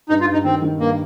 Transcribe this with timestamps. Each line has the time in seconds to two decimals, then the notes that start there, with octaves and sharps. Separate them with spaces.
0.09 G2 D#4
0.21 F4
0.28 G2
0.33 D#4
0.44 D#3 C4
0.62 D#3
0.80 G2 A#3